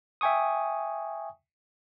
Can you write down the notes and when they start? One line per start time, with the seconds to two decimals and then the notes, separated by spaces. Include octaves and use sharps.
0.21 E5 G5 G#5 C#6 D#6